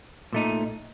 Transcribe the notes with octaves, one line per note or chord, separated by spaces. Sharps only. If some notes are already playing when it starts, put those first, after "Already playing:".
A#2 A3 D#4